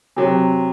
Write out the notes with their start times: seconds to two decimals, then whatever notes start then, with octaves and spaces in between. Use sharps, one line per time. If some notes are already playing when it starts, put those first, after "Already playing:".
0.16 C3 F#3